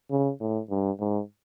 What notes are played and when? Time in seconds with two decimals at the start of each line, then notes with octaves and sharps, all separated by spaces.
0.10 C#3
0.40 A2
0.70 G2
1.00 G#2